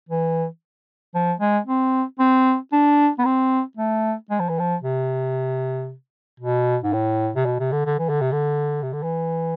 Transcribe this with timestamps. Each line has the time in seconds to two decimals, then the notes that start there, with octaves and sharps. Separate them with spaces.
0.09 E3
1.14 F3
1.40 G#3
1.66 C4
2.19 C4
2.72 D4
3.18 B3
3.25 C4
3.77 A3
4.30 G#3
4.40 F3
4.49 E3
4.59 F3
4.82 C3
6.40 B2
6.83 G#2
6.93 A2
7.35 C3
7.45 B2
7.59 C3
7.72 D3
7.85 D3
7.98 E3
8.09 D3
8.21 C3
8.32 D3
8.82 C3
8.93 D3
9.03 E3